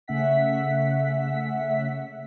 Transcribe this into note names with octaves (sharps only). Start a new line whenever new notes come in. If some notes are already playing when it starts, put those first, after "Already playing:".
C#3 A3 C#4 E5 F#5 B6